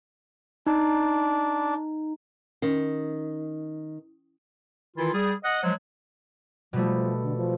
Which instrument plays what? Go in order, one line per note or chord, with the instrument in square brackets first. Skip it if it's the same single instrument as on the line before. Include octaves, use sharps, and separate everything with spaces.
[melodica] D4 [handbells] D#4
[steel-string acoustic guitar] D#3 [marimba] C#4
[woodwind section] D#3 E3 E4 F4
G3 G#4
D#5 F#5
F3 F#3 G#3
[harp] B2 G3 A3 [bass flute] F3
[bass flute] D3
F3